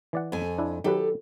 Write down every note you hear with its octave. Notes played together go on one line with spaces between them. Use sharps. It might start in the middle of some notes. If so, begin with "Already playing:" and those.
E3 D5 F#5
F2 G#5
D4 E4
D#3 F#3 G4 A4 B4